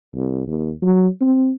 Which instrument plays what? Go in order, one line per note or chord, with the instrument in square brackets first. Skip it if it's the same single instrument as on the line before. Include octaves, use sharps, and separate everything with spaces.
[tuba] C2
D#2
F#3
C4